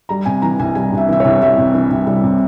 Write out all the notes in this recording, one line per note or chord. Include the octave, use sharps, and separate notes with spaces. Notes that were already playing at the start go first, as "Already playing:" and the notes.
G3 A#5
C3 G#5
E3 A#5
C2 G#5
G3 G#5
C3 E5
E3 E5
C#5
C2
G3 E5
C3
E3
C2
G3
C3